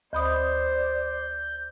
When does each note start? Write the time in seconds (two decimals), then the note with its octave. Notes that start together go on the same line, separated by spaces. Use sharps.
0.13 D2 C5 D5 B5 D#6 G6